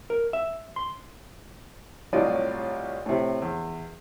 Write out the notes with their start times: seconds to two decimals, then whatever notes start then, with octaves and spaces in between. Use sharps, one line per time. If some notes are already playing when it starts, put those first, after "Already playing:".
0.10 A#4
0.33 E5
0.76 C6
2.13 C2 A2 F#3 F4 D5 D#5
3.06 A2 C3
3.42 E2